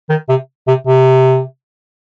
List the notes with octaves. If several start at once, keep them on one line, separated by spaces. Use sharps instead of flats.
D#3
C3
C3
C3